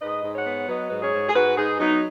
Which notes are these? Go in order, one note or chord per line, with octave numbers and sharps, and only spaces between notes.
G#2 B4 D#5
G#2
C#5 F#5
B3
F#3 B4 D#5
G#2 B4
G#4 C#5
G#2
G#4
G#2 F#4 B4
G#2 D#4 G#4
F#3 B3 D#4